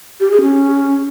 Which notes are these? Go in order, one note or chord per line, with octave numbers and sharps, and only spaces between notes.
G4
G#4
C#4